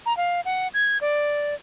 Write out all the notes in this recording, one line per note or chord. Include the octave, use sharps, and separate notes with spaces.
A#5
F5
F#5
G#6
D5